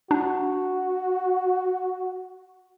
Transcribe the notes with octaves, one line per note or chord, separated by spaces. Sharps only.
D4 F#4